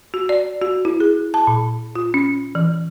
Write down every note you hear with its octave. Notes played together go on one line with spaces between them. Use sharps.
F#4
D5
F#4
E4
G#4
A5
A#2
F4
C#4
E3